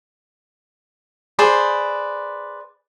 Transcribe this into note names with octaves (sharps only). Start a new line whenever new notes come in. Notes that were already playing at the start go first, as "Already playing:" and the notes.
G#4 B4 C5 D5